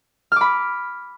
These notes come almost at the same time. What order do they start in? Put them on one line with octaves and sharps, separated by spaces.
F6 D6 B5